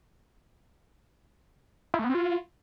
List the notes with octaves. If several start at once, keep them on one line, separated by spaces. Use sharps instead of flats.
E4
A3
B3
C4
F4